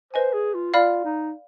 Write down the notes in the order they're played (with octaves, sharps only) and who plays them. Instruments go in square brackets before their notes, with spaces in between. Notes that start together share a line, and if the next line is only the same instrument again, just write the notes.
[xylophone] B4 D#5 G#5 [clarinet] C5
[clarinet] G#4
F4
[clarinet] F4 [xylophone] D5 F5 B5 F6
[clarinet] D#4